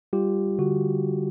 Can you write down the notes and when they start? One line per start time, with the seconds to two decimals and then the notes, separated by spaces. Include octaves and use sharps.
0.13 G3 F4 G4
0.59 D3 F#4